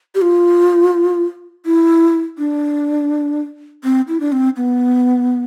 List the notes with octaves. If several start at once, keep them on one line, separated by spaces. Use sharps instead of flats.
G4
F4
E4
D4
C4
E4
D4
C4
B3